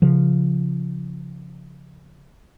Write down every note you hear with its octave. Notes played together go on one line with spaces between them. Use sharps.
C#3 F3